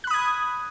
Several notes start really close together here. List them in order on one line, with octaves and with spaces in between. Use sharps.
F#6 B5 D#6 G#6